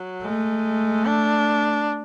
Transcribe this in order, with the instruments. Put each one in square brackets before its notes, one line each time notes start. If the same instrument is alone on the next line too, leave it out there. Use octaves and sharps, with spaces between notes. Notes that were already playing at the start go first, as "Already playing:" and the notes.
Already playing: [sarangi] F#3
[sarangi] G#3 [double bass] A3
[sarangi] D4